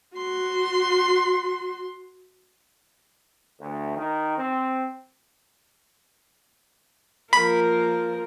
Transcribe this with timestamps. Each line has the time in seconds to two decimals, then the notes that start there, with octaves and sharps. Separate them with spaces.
0.16 F#4 C6
3.59 D2
3.96 D#3
4.37 C4
7.33 F3 A#3 A#4 B5